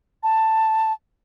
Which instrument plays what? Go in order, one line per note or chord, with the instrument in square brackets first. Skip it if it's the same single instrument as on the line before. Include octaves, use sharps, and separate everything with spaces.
[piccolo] A5